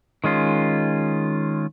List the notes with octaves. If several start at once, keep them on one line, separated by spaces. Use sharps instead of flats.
D#3 G#3 C#4 F4